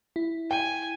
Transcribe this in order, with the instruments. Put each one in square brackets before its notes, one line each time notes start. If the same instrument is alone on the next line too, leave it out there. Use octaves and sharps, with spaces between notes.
[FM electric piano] E4
[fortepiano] G5 [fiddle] G#5